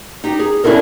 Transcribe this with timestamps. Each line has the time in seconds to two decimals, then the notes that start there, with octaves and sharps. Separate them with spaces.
0.24 D#4 G4
0.39 G#4
0.64 C#4 D4 E4 F4 A4 A#4